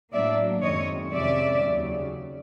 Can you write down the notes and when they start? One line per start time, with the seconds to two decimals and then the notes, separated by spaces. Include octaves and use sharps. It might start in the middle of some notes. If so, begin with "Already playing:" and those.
0.12 A2 F#3 A#3 D4 D5 E5
0.62 F#2 D#3 G#3 C4 C#5 D#5
1.13 F2 C3 D#3 G#3 C#4 D5 E5
1.63 D#2 C#3 F#3